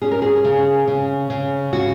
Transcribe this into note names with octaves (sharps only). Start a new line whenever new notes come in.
C#4 G#4
A#4
G#4
C#3
C#3
C#3
C#3 F#4